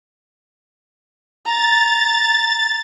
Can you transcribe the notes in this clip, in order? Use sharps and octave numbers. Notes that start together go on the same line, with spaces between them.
A#5 A6